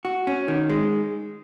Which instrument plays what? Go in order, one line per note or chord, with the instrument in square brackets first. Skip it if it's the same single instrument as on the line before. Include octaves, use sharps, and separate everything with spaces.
[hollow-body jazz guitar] F#4
C#4
D#3
G#3